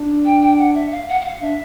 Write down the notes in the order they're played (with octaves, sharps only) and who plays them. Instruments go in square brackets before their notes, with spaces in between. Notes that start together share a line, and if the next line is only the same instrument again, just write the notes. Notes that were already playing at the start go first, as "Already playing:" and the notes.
Already playing: [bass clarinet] D4
[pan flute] G5
G5
F#5
E5
F5
F#5
F#5
F5
[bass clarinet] D4 [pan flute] E5